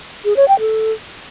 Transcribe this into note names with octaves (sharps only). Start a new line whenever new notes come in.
G#4
C#5
G5
A4